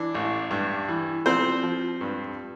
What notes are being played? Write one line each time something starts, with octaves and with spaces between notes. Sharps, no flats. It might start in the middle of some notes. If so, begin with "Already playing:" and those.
Already playing: E3 D4
A1
G2
E3
F3 C4 C5
F3
G2